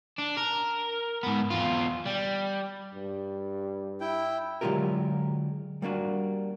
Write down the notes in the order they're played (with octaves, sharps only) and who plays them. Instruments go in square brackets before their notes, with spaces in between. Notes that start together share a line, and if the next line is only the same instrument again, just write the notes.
[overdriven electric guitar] D4
A#4
G#2 B3
E2 F4
G3
[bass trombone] G2
[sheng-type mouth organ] E4 G5
[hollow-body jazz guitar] D3 F#3 G#3 F4 G4 A#4
G3 A#3 D4 F#4